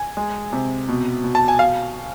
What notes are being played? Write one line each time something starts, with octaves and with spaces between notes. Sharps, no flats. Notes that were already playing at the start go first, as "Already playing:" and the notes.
Already playing: G#5
G#3
C3
B2
B2
A5
G#5
F5